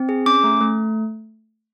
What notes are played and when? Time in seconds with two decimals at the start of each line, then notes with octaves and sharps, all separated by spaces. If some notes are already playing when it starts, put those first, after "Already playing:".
Already playing: C4
0.09 G#4
0.26 C#4 D6
0.44 A3
0.61 A3